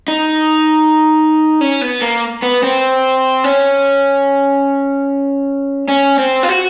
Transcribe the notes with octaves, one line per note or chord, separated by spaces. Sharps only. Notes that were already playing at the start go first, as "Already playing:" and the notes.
D#4
C#4
B3
A#3
B3
C4
C#4
C#4
C4
F4
F#4